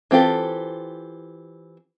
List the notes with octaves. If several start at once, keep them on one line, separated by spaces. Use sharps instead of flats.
E3 C4 F4 G4 A4